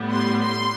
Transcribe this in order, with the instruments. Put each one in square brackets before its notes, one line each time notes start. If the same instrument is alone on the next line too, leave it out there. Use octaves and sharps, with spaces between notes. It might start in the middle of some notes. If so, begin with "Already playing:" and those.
Already playing: [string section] A2 G3 B3
C6
C6